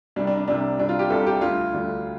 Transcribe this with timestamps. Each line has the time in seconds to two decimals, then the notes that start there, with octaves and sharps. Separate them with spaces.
0.16 C2 C3 G3 D4
0.27 D4
0.37 D4
0.48 C2 C3 G3 D4
0.78 C2 C3 G3 D4
0.89 F4
0.99 G4
1.10 C2 C3 G3 A4
1.26 G4
1.41 D2 D3 G3 F4
1.73 D2 D3 G3